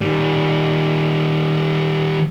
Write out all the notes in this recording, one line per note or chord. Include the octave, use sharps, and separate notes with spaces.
D#3 G3